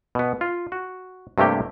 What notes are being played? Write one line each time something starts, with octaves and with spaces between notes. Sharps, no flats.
B2 B3
F4
F#4
G2 C3 A3 A#3 G4 G5